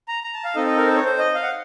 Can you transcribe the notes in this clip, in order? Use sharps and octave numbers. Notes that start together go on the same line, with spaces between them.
A#5
A#5
A5
F5
C4 D#4 A4 D#5
D#5
A#4
C5
C#5
C5
D#5
F5
F#5